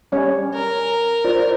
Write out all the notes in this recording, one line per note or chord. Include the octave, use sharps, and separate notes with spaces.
G3 C#4 C#5
A#4
F4 C5 D5